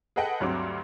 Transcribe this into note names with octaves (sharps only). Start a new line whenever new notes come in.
G#4 A4 B4 D#5 F#5 G5
D2 G2 F#3 C4 D6